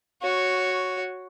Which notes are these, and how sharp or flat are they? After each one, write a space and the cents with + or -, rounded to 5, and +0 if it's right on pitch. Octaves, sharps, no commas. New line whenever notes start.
F#4 +0 C#5 +0